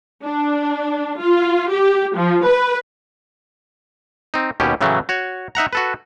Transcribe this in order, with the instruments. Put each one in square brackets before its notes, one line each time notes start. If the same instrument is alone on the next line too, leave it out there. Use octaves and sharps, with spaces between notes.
[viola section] D4
F4
G4
F3
B4
[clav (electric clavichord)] C4 D#4
D#2 B2 C#4 G4
A2 C#3 E3 F#3 A3
F#4 C#5
D#4 E5 F#5 A#5
F#4 A4 B4